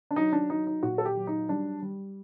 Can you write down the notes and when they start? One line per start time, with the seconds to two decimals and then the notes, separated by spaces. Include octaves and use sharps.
0.11 D4
0.16 F#3 D#4
0.33 D4
0.50 F#3 D#4
0.67 D#4
0.83 A#2 F#4
0.98 A4
1.05 G4
1.16 F#3
1.27 D#4
1.49 G3 D4
1.82 G3